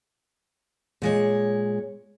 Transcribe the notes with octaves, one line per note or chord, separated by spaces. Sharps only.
A#2 G#3 C#5